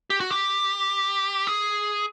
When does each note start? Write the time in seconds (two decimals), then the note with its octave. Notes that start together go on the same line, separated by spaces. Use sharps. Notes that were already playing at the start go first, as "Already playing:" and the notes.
0.10 G4
0.20 F#4
0.31 G4
1.47 G#4